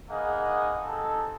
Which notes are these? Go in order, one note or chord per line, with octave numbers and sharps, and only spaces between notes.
A#3 B3 D#4 G#4 D#5 F#5
G#3 C4 D#4 G4 A4